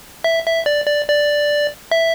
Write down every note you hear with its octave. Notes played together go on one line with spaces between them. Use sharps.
E5
E5
D5
D5
D5
E5